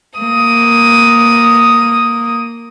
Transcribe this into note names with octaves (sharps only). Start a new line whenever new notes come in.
A#3 D#6